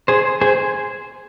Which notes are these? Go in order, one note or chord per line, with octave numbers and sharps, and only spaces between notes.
G#4 C5
G#4 C5